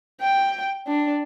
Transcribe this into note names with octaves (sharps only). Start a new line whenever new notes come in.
G5
D4